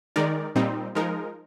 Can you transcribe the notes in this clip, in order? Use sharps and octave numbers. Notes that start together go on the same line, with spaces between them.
D#3 G#3 D#4 A#4 D5
A#2 G3 C4 D#4
F3 G#3 D#4 A#4